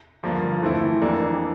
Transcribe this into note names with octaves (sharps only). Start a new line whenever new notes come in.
G2 D3 F3 A#3
E3 A3 C4 E4 A4
F2 E3 A#3 D4 A4